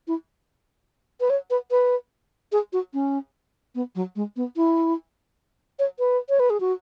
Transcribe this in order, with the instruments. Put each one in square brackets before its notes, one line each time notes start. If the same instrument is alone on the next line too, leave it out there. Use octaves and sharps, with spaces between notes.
[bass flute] E4
B4
C#5
B4
B4
G#4
F#4
C#4
B3
F#3
G#3
B3
E4
C#5
B4
C#5
B4
G#4
F#4